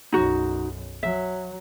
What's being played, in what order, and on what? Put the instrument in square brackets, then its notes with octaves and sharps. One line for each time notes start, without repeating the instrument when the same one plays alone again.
[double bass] B1 F#2 [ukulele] D#4 F#4
[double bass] F#3 [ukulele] E5